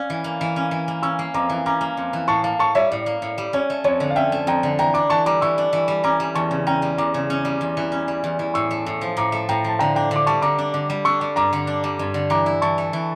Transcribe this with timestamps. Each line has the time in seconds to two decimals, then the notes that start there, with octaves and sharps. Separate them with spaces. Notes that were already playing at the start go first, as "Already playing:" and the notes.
Already playing: C#4 D5 F5
0.10 E3
0.24 A#3
0.41 E3
0.56 C#4
0.71 E3
0.88 A#3
1.03 C#4 C#6 E6
1.19 A#3
1.34 F2 A#5 D6
1.50 E3
1.66 C#4 A#5 D6
1.81 A#3
1.97 F2
2.13 E3
2.28 A2 A5 C#6
2.44 A#3 F5 A5
2.59 A2 A5 C#6
2.75 G3 C#5 E5
2.91 A2 D5
3.06 A#3
3.22 A2
3.38 G3
3.53 C#4 C#5
3.70 A3
3.84 F2 C#5
4.00 D3
4.10 F5
4.16 C#4 E5 G5
4.32 A3
4.47 F2 G5 A#5
4.63 D3
4.79 E3 G5 A#5
4.94 D4 A#5 D6
5.10 E3 A5 C#6
5.26 G3 A#5 D6
5.41 E3 C#6 E6
5.58 D4
5.73 E3
5.88 G3
6.04 C#4 A#5 D6
6.20 G3
6.35 E2 A5 C#6
6.51 C#3
6.67 C#4 G5 A#5
6.82 G3
6.98 E2 A#5 D6
7.14 C#3
7.30 C#4
7.45 G3
7.61 E2
7.77 E3
7.92 C#4
8.08 G3
8.24 E2
8.39 E3
8.54 A2 C#6 E6
8.71 A3
8.86 A2
9.01 F3
9.17 A2 A#5 D6
9.32 A3
9.49 A2 G5 A#5
9.64 F3 A5
9.79 D3 G5 A#5
9.96 D4 G5 A#5
10.11 D3 D6
10.27 G3 A5 C#6
10.42 D3 A#5 D6
10.58 D4
10.74 D3
10.90 G3
11.05 D4 C#6 E6
11.21 G3
11.36 G2 A#5 D6
11.53 D3
11.67 D4
11.84 G3
11.99 G2
12.14 D3
12.30 E3 A#5 D6
12.46 E4
12.62 E3 A5 C#6
12.78 A3
12.93 E3